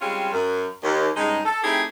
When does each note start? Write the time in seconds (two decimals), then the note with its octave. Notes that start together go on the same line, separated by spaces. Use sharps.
0.01 G3 G#3 C4 C#4 F4
0.33 F#2
0.83 D#2
1.17 G2 C#3 G#3 D#4
1.45 A4
1.64 A3 C4 D#4 E4 G4 G#4